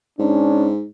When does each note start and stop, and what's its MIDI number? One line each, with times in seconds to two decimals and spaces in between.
0.19 0.85 44
0.19 0.68 61
0.19 0.68 62